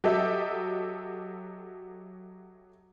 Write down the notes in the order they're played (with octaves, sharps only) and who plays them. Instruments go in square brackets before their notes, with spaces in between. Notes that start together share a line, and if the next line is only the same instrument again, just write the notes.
[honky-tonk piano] F#3 G4 A4 D#5 E5